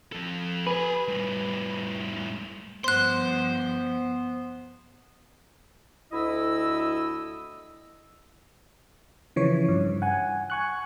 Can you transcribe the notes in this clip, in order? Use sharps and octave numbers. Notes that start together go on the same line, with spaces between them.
F3 A4
G4 B4 G#5
A2 G3
G2 F3 B3 C5 C6 F#6
D2 E4 D#5 E6
C#3 E3 F3 C#5
G2
F#5 G#5
G#5 C#6 F#6